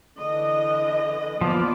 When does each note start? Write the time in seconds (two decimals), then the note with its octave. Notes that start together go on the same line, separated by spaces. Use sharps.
0.18 D3 E3 D#5
1.41 F3 A#3 B3 D5